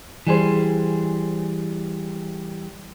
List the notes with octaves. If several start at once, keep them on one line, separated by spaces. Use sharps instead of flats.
E3 G3 G#4 C5